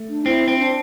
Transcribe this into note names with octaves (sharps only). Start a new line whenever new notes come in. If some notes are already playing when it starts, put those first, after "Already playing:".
Already playing: A3
D4
C4 E4
C4
D4